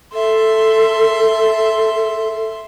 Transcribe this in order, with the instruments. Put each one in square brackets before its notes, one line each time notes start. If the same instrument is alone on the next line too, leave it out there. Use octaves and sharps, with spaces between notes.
[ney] A4 [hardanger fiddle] E5 C6